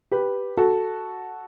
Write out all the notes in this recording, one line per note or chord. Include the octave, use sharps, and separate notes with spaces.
G4 B4
F#4 A4